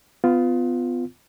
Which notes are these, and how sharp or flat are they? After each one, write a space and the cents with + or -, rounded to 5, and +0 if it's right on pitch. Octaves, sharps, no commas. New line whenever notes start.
B3 +30 F4 +0